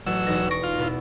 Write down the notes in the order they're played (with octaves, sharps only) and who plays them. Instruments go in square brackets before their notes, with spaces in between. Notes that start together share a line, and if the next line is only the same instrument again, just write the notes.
[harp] A1 [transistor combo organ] F#3 E6
[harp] E1 D#4 A#6
C#6 A#6 D7
[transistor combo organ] F4
[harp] B2 B3 E4